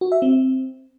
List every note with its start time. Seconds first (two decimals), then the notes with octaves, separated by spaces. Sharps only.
0.01 F#4
0.12 E5
0.22 C4